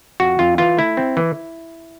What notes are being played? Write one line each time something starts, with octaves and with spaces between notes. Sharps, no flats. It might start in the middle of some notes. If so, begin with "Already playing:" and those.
F2 F#4
F2 F4
E3 F4
A3 E4
C4
E3